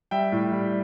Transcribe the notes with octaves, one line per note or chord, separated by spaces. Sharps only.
G3 E5 G5
A2
G3